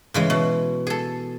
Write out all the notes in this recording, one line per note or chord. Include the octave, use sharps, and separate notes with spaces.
C#3 E3 G#3
B2
G#4 A4